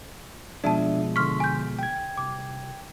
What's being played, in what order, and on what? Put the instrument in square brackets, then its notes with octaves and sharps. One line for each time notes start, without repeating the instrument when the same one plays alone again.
[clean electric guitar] B2 F3 G#3 [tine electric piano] D4 E5 [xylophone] D5 A5
[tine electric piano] D3 C6 B6 [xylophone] C#6 F6
[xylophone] G#5 G6
[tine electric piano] G5 G#6
[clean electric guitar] C2 [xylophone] D6